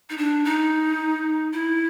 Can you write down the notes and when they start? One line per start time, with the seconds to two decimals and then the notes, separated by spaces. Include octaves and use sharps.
0.10 D#4
0.18 D4
0.45 D#4
1.53 E4